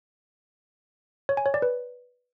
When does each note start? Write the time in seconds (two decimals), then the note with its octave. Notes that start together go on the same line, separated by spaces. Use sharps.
1.29 C#5
1.37 G#5
1.46 C#5
1.54 D5
1.62 B4